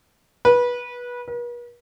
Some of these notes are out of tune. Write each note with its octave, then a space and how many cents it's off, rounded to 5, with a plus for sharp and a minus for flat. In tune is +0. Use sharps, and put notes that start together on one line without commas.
B4 -20
B4 -45